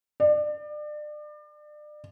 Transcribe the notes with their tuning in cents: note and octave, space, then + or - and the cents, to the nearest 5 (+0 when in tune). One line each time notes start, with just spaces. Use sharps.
D5 +30